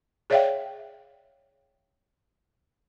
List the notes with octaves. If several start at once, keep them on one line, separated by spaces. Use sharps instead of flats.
G#4 C#5 D5 E5 F5 G5